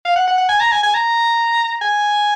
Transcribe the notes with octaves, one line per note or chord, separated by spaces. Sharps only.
F5
F#5
F#5
F#5
G#5
A#5
G#5
G#5
A#5
G#5